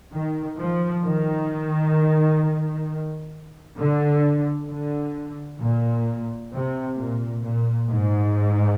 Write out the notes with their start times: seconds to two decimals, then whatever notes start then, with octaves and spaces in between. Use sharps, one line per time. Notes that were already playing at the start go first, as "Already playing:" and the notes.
0.13 D#3
0.58 F3
1.04 D#3
3.78 D3
4.68 D3
5.60 A#2
6.52 C3
6.96 A#2
7.43 A#2
7.88 G#2